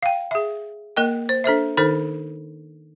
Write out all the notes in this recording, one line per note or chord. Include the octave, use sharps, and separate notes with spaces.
F5 G5
G#4 E5
A#3 A#4 D#5 G5
C5
D4 A4 C5 E5
D#3 D#4 A4 C5